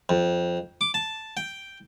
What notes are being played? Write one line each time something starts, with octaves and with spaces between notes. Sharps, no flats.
F2
D6
A5
G5